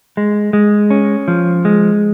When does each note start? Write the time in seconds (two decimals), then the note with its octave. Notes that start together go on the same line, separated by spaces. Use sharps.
0.17 G#3
0.53 G#3
0.90 C#4
1.28 F3
1.65 G#3